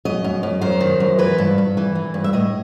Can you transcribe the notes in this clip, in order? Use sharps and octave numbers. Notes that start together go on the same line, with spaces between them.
F#2 D#5
F#2
F#2
F#2 C5
D#3
F#2
E3 B4
G2
G2
E3
E3
G2
E5
A2 D#5